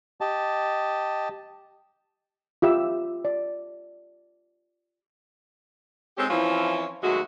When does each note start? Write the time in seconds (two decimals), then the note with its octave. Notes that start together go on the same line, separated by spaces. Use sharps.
0.21 G4 D#5 A5
2.62 F4 G4 E5 E6
3.25 D5
6.18 G#3 C4 C#4 D#4 G4 A4
6.30 E3 F3 C4 C#4 E4
7.03 D#2 F#3 G#3 A3 F#4